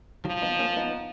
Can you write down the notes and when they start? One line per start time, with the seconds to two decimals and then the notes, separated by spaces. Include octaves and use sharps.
0.25 D#3 F3 F#3
0.42 B3 D#4
0.59 A#3 C#4
0.77 B3 D#4